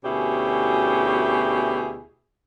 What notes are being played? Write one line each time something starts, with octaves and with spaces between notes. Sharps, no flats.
D2 B2 C#4 E4 G4 G#4